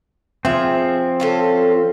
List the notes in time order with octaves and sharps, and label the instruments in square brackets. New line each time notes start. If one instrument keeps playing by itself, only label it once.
[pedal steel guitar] F3 C4 [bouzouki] G#4 E5
[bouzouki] C#4 F4 A4